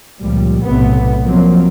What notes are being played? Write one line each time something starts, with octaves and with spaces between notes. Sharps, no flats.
C#2 A#2 F3 G3
B1 A2 C3 A3 B3
F3 F#3 A#3 C4